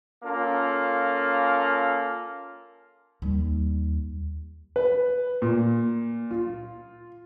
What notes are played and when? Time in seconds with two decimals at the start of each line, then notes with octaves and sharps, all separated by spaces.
0.23 A#3 C#4 F4 A4
3.22 D#2 G3
4.76 B4
5.42 A#2
6.31 F4